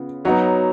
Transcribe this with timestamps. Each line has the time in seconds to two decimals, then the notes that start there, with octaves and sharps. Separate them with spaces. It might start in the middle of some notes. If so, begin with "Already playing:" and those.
Already playing: C#3 B3 F4
0.25 F#3 B3 D#4 F#4 C#5